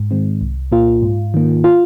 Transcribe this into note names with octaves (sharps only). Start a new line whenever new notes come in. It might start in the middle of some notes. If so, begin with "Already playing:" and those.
Already playing: G#2
D#3 G#3 C4
C2
A#2 A#3 F4
G#2
D#3 A#3
F4